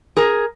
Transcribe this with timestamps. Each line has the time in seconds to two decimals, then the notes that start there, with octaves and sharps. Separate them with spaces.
0.17 G#4 A#4